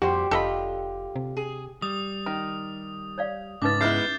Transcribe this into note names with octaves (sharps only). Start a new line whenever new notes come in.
F2 A#2 G3 F#4 G4 C5
F1 D3 F4 A4 D#5 B5
C3
G#4
G3 D#6
D#3
C#5 D5 F5
C#2 G#2 C#3 C#4 D#4 B4 D6 A6
G#3 B3 E4 E5 F6 G6 C7